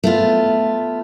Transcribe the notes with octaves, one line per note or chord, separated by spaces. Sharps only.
A3 B3 F4